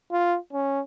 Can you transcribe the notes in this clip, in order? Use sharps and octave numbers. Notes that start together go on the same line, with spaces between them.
F4
C#4